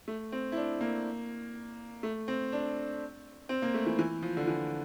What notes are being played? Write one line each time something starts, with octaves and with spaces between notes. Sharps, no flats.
A3
C4
E4
D4
A#3
A3
C4
D4
C4
A#3
A3
E3
E3
F3
D3
E3